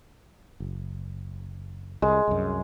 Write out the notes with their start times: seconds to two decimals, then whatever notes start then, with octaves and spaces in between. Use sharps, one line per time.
0.60 F#1
2.02 C2 G#3
2.28 C2 F#2